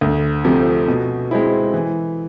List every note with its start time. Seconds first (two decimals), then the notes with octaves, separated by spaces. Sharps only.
0.01 D2
0.44 C3 F3 A3
0.88 B2
1.31 G#3 C4 E4
1.74 E3